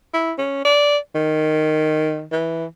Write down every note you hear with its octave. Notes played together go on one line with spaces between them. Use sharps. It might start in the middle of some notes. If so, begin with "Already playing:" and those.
E4
C#4
D5
D#3
E3